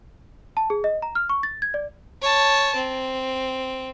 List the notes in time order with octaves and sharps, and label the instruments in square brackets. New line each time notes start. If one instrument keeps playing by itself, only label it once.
[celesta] A5
G#4
D#5
A#5
F6
C#6
A6
G#6
D5
[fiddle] C#5 A5
C4